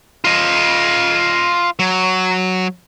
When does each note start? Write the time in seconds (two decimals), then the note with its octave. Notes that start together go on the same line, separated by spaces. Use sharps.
0.24 F4 D#5
1.79 F#3